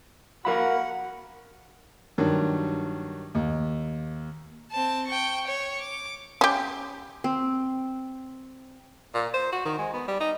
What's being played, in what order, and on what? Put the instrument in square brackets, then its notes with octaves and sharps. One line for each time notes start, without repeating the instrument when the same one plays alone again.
[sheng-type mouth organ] F#4 F#5 [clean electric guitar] A#4 F5 B5
[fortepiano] G2 D#3 F#3
D#2
[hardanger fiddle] C4 A5
G5 C#6
C#5
D6
[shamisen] C#4 G4
[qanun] C4
[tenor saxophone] A#2
C5
F#4
D#3
G#3
B3
G3
D#4